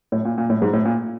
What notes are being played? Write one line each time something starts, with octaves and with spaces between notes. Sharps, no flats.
A2
A#2
A#2
A2
G#2
A2
A#2